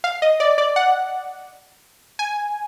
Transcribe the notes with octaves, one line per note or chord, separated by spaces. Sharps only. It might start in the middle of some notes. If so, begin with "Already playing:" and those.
F5
D#5
D5
D5
F#5
G#5